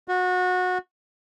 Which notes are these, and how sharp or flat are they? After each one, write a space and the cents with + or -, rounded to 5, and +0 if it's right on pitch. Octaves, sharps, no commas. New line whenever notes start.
F#4 -25